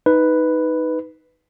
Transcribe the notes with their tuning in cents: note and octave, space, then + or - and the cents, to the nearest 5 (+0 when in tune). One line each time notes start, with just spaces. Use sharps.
D#4 +10 B4 +0